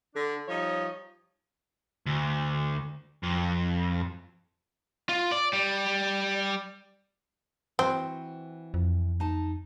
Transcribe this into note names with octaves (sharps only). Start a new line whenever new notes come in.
D3 D4
F3 G3 D#4 C#5 D#5
D2
F2
F4
D5
G3
E3 C4 F#4
F2
D#4 A5